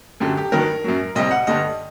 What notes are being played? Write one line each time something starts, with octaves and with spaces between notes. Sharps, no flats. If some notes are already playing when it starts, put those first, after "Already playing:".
F#2 D3 F#3 G4
G4
G2 D#3 F#3 A#4
F#2 F#3
C2 C3 G3 D#5
F#5
G2 D3 G3 D#5